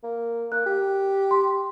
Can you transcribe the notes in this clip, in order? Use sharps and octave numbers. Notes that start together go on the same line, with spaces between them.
A#3
A#3 F#6
G4
C6